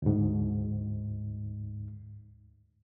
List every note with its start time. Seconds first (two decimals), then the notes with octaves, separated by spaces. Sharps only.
0.02 D2 G#2